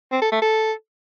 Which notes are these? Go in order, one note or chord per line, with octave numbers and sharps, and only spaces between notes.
C4
A4
A3
A4